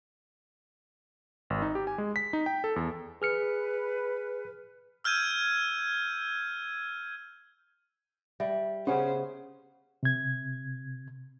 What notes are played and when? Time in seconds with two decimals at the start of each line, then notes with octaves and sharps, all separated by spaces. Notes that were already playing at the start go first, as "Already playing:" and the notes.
1.50 G#1
1.62 D#4
1.75 G4
1.87 G#5
1.98 G#3
2.16 B6
2.33 D#4
2.46 G5
2.64 A4
2.76 E2
3.22 G#4 B4 F6 C#7
5.04 E6 F6 G6 G#6 D#7
8.40 G3 E5
8.87 C#3 B3 C#4 G4 C5
10.03 C3 G#6